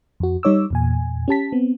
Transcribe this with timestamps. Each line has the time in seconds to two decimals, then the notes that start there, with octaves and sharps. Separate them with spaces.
0.20 F2 F#4
0.43 G3 D#4 C#5 D6 E6
0.70 E2 A#2 G#5
1.28 C#4 G4 A5 B6
1.52 B3 C4